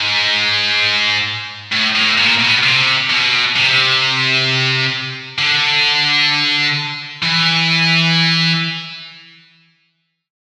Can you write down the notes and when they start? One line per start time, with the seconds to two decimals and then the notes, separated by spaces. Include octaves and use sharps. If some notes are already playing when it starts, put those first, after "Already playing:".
Already playing: G#2
1.72 A2
1.95 A2
2.18 A#2
2.40 B2
2.63 C3
3.10 B2
3.56 C3
5.38 D3
7.23 E3